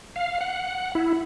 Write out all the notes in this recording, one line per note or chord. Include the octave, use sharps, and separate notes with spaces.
F5
F#5
E4